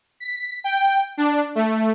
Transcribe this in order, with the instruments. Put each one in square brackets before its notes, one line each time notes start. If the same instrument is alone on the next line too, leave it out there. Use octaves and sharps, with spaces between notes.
[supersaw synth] B6
G5
D4
A3